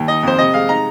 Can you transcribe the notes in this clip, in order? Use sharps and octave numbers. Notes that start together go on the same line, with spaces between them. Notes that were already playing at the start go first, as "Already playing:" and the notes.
Already playing: D#2
D#4 D#5
F2 C5
C3 D#5
G#3 F5
D#4 A#5